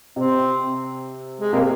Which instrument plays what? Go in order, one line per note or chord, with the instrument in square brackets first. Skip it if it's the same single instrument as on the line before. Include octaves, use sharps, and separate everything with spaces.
[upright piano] C3 [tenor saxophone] C4
[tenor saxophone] G#3
[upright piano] C3 [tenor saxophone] A#3